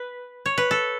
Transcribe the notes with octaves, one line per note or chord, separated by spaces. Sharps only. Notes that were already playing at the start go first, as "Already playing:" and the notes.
Already playing: B4
C#5
B4
A4